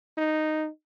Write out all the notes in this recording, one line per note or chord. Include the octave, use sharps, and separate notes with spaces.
D#4